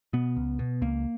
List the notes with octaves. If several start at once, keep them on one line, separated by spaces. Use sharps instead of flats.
B2 B3
C#2
B2
C#2 A#3